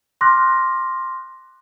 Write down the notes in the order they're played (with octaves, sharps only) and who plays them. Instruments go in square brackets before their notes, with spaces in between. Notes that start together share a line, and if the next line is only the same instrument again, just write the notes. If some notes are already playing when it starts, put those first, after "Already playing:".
[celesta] C6 D6 F6 F#6 A#6